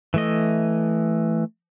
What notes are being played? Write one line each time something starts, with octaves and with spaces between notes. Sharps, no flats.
E3 A3 D#5